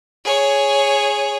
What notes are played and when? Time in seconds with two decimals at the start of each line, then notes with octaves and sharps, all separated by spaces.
0.24 G#4 C#5